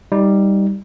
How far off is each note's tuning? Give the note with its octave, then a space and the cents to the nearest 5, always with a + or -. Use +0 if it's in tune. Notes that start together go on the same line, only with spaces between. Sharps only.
G3 +5 D#4 +20